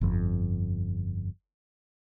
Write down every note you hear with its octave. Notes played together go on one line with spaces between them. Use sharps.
G1 F2